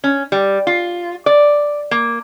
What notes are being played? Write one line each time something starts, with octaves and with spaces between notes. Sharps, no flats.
C#4
G3
F4
D5
A#3